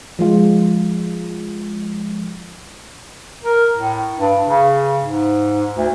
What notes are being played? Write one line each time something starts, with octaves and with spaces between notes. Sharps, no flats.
F3 G#3 F4
A#4
A2
G2
C#3
G#2
D2